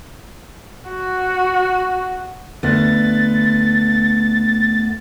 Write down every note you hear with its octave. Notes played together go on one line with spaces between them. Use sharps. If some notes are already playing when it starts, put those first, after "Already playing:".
F#4
D2 B3 A6